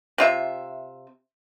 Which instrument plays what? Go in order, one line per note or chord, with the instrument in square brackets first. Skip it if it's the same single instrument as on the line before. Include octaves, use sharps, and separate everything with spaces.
[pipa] C3 F4 E5